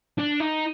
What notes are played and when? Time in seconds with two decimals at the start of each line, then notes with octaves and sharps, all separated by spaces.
0.19 D4
0.41 D#4